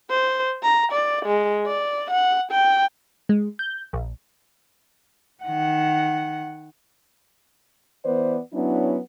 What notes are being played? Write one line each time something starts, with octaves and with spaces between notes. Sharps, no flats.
C5
A#5
D5
G#3
D5
F#5
G5
G#3
G6
A#1
D#3 F#5
E3 B3 B4 C5 D5
F#3 B3 C#4 D4 E4